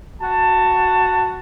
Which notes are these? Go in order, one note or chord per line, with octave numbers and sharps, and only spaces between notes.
F#4 A5